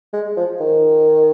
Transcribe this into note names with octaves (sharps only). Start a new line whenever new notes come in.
G#3
F3
D#3